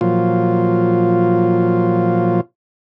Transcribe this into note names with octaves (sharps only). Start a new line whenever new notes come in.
A#2 F3 F#3 F4